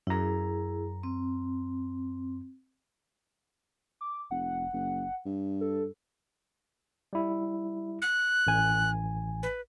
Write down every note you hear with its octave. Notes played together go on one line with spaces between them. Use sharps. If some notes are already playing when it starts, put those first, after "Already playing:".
F#2 E4 G#4 A#5
C4
D6
F1 F#5
F#1
G2
A4
G3 E4
F#6
A1 G#5
B4